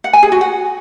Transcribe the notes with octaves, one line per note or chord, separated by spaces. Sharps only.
F#5
G#5
G#4
F#4
F#5